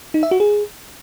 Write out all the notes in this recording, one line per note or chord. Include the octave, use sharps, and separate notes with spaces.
D#4
E5
F#4
G#4